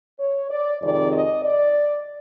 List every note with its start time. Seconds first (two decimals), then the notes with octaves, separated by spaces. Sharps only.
0.20 C#5
0.50 D5
0.81 F2 C3 D#3 G#3 D5
1.12 D#5
1.43 D5